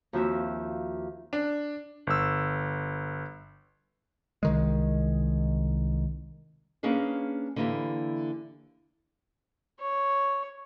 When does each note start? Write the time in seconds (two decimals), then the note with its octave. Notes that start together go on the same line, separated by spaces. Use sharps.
0.13 D#2 F3 C4 F#4 E5 E6
1.33 D4
2.07 G1 E6
4.43 C2 D#3 G#3
6.83 A#3 C#4 D4 G#4 B4
7.56 D3 E3 A#3 E4 G4
9.79 C#5